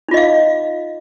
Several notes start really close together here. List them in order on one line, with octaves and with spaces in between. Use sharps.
D#4 F4 D#5 F5